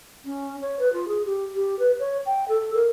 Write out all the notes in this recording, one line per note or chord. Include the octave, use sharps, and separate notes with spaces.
C#4
C#5
B4
F4
G#4
G4
G4
B4
C#5
G5
A4
A#4